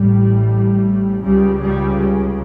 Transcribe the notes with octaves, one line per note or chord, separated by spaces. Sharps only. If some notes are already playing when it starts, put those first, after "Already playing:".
Already playing: A1 A2 G3
C#2 C#3 G3
G3